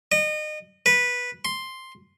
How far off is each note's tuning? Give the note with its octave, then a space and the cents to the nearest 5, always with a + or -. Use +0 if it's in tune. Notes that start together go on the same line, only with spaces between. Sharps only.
D#5 -30
B4 -10
C6 +5